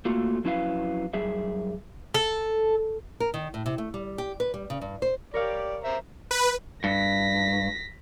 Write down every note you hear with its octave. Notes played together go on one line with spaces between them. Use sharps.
A3 A#3 F4 F#4 A4
F2 F#3 C#4 E4 B4 F5
F#2 G3 G#4 E5
A4
A#4
D#3
A2
C3
A3
G3
G4
B4
G3
C#3
G2
C5
G4 A#4 C#5 D5 F5
C5 E5 A#5
B4
G2 A#6 B6